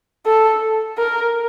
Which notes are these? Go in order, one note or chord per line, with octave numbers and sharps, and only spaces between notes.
A4
A#4